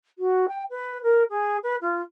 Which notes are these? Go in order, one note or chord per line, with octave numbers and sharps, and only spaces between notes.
F#4
G5
B4
A#4
G#4
B4
F4